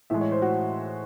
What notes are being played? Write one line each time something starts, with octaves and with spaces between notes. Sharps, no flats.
A2 E3 G#3 E5
C#5
C5
F#4